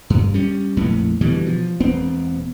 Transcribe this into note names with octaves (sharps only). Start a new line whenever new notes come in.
G2
G3 C#4
A#1 F2 A2 B3
B2 D3 E3 G3
F3
E1 B3 C4